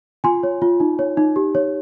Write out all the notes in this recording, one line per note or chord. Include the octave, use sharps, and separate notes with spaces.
F4 G#5 C6
C#5
F4
D#4
C#5
D#4
G4
C#5